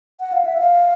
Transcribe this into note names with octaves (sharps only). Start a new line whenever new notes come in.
F#5
F5
E5
F5